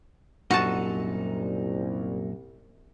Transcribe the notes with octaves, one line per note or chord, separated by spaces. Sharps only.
C2 F#2 A#2 D#4 F#4 A5